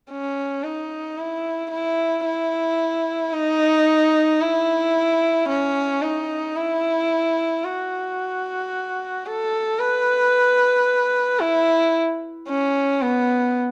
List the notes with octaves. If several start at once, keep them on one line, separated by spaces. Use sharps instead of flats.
C#4
D#4
E4
E4
E4
D#4
E4
C#4
D#4
E4
F#4
A4
B4
E4
C#4
B3